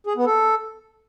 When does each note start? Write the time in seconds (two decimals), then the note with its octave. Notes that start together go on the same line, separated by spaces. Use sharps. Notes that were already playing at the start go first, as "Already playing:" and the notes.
0.07 G#4
0.16 B3
0.26 A4